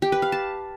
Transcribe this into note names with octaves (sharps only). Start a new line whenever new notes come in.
G4
B4
F5
A5